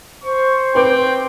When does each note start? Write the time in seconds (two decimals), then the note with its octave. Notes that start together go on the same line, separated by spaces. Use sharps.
0.23 C5 C#6
0.75 C4 B4 G5 D6